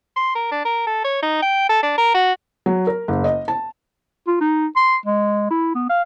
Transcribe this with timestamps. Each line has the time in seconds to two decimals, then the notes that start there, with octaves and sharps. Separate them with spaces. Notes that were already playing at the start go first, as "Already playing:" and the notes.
0.16 C6
0.35 A#4
0.51 D4
0.65 A#4
0.87 A4
1.04 C#5
1.22 D#4
1.42 G5
1.69 A4
1.83 D4
1.98 A#4
2.14 F#4
2.66 F#3
2.87 A#4
3.08 F#1
3.24 D#5
3.48 A5
4.27 F4
4.40 D#4
4.76 C6
5.06 G#3
5.51 E4
5.75 B3
5.90 F5